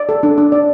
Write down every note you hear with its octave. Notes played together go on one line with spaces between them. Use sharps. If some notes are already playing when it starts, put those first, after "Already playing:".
Already playing: D5
A4
D4
D4
D5